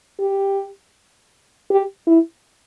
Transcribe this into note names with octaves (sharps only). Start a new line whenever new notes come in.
G4
G4
E4